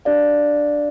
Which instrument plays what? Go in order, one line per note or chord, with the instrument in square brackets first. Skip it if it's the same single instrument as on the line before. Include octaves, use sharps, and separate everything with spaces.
[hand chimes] D4 G4 D5 F5